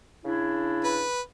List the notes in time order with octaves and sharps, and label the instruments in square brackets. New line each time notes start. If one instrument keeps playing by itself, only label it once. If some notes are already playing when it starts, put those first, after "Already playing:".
[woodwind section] C#3 D4 E4
[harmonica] B4